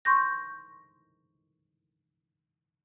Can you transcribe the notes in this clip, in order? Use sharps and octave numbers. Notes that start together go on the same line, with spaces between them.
C6 C#6 G6 A#6